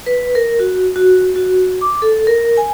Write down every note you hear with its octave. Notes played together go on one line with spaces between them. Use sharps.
B4
A#4
F#4
F#4
F#4
D6
A4
A#4
G#5